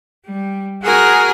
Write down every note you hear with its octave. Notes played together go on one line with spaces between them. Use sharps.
G3
F#4 G#4 A#4 F#5 G#5